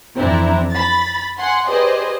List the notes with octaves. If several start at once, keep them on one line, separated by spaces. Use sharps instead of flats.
F2 E3 C4 D4 E4 A#5
B5 A6
F#5 G#5 C6
G4 G#4 B4 C5 D5 D#5